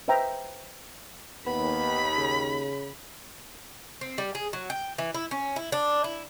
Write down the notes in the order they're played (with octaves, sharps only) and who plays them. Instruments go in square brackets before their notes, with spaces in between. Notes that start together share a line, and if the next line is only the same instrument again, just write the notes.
[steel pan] B4 C5 E5 G5 A#5
[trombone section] D#2 [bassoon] B3 [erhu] B5
[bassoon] C#3
[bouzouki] C4
G3
G#4
F#3
G5
E3
E4
C#4
E4
D4
E4